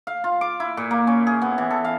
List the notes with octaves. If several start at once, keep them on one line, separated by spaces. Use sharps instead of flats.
F5
F4
D6
E4
A#2
A#3
C#4
G#4
B3
E3
A4
F5